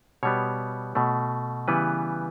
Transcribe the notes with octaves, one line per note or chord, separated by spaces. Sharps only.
B2 G3 B3 C#5
B2 A3
C#3 E3 G3 B3 B4